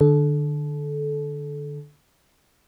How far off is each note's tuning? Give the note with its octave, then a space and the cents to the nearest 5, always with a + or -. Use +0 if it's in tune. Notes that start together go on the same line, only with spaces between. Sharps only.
D3 +20 A4 -25